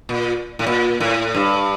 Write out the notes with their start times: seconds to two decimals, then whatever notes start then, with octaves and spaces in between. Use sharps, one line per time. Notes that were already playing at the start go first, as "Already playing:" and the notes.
0.09 A#2
0.59 A2
0.67 A#2
1.00 A2
1.34 G2